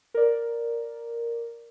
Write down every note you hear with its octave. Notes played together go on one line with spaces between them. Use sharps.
A#4 D5